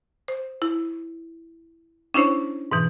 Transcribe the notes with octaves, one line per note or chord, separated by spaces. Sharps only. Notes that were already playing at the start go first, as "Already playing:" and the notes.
C5
E4
C#4 D4 E4 C5 C#5
G#2 B2 E3